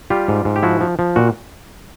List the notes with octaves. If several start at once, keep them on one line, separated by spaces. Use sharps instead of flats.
G3 F4 G4
G#2
G#2
G4
F3 E4 F#4
F3
F3
A#2 F#4